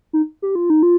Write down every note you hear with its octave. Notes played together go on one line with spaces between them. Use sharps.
D#4
G4
F4
D#4
F4